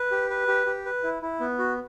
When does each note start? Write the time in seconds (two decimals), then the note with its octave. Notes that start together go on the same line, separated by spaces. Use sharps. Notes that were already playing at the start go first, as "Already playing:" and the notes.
Already playing: B4
0.11 G4
0.30 B4
0.48 G4
0.66 G4
0.86 B4
1.03 E4
1.22 E4
1.40 B3
1.59 F#4